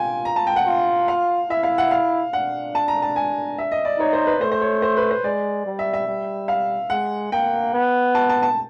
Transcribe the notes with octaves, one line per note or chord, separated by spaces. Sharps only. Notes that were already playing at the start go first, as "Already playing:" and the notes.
Already playing: F4 G5 G#5
A#5
A5
G5
F#5
F4
F5
E4 E5
F5
F#5
F5
D4 F#5
A5
A#5
A5
G#5
E5
D#5
D5
D#4 C#5
C5
B4
A3 C5
C5
C#5
C5
B4
C5
G#3 D5
G3
E5
E5
G3
F5
G#3 F#5
A#3 G5
B3
A5
A5
A5